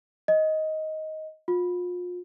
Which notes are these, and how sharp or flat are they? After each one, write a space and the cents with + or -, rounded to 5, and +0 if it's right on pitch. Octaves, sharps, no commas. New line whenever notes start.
D#5 +10
F4 +35